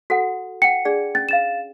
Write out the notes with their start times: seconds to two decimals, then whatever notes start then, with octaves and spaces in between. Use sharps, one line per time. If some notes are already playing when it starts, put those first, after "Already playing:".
0.10 F#4 A4 F#5
0.62 F#5 G5 C#7
0.85 D4 G#4 D5
1.15 C#4 A6
1.29 F5 A6 E7